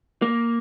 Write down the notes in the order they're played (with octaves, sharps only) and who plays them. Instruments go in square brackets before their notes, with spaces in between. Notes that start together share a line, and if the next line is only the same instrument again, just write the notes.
[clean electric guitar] A#3